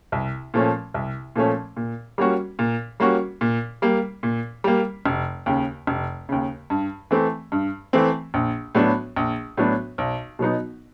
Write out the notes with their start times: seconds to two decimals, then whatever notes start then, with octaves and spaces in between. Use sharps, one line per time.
0.12 C2
0.54 A#2 F3 A3 C#4
0.94 C2
1.36 A#2 F3 A3 C#4
1.77 A#2
2.18 G3 A#3 C#4 F#4
2.59 A#2
3.00 G3 A#3 C#4 F#4
3.41 A#2
3.82 G3 A#3
4.23 A#2
4.64 G3 A#3
5.06 F1
5.46 D#2 C#3
5.87 F1
6.29 D#2 C#3
6.70 G2
7.11 E3 A3 C4
7.52 G2
7.93 E3 A3 C4
8.34 A#1
8.75 A2 F#3 B3 D4
9.16 A#1
9.57 A2 F#3 B3 D4
9.98 B1
10.39 B2 F#3 B3 D#4